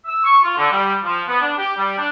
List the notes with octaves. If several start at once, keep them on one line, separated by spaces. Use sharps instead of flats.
E6
C#6
F4
D3
G3
F3
B3
D4
G4
G3
D4